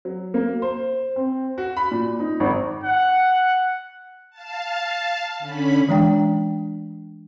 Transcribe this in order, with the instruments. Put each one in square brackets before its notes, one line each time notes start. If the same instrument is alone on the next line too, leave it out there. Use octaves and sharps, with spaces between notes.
[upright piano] F#3
A#3
C5
C4
F#4
B5
A#2
D#4
G#1
[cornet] F#5
[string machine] F5 A5
D3 C#4 B5 B6
[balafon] E3 G#3 D4 G5